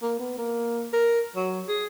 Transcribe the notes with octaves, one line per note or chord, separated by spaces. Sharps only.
A#3
B3
A#3
A#4
F#3
G#4